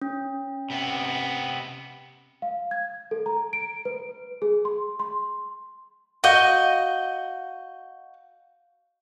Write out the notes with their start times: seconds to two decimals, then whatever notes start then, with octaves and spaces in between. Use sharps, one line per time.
0.02 C#4
0.70 C3 B3
2.42 F5
2.71 G#6
3.11 A4
3.26 A#5
3.53 D7
3.85 B4
4.42 G#4
4.65 C6
5.00 C6
6.24 F#4 D#5 F5 G6 G7